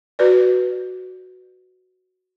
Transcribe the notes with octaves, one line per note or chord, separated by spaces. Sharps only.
F#4 B4 D5